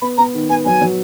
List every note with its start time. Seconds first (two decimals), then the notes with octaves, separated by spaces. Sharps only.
0.02 B3 B5
0.18 B3 A#5
0.34 D#3
0.50 B3 G#5
0.65 F#3 G#5
0.82 F#3